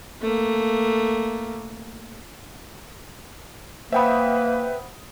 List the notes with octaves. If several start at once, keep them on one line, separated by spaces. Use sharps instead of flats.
A3 A#3
A#3 B4 C5 E5 F#5 G5 B5 D#6